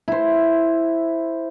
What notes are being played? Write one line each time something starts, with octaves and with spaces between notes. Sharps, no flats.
E4 C5